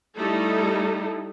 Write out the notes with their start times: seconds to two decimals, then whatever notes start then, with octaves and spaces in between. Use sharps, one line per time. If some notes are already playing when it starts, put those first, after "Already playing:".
0.17 G3 A3 D#4 E4 A4